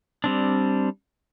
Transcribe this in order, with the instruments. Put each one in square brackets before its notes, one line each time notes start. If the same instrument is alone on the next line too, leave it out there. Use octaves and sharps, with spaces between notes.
[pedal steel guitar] G3 C4 D4